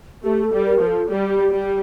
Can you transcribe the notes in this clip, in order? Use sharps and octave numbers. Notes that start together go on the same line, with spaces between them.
A3 G4
A4
G3
A#4
F3
A4
G3 G4 A4
G3